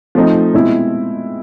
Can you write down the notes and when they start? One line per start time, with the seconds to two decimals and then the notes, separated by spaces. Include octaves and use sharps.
0.15 F3 A3 C4 D#4
0.54 B2 G#3 C4 E4